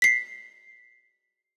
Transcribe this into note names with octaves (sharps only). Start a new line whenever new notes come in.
B6 C7